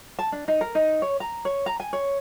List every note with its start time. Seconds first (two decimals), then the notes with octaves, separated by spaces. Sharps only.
0.19 A5
0.32 D4
0.48 D#4
0.61 A#4
0.75 D#4
1.02 C#5
1.20 A#5
1.45 C#5
1.66 A#5
1.80 G#5
1.93 C#5